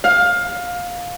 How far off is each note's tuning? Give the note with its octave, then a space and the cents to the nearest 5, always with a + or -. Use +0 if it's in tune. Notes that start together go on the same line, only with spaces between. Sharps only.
F5 +20